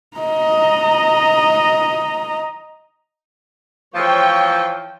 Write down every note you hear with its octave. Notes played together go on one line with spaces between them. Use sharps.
D#5 A#5
E3 F3 C#5 G5